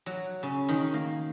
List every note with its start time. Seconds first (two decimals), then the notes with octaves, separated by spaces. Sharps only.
0.06 F#3
0.43 C#3
0.69 D#3
0.94 A#3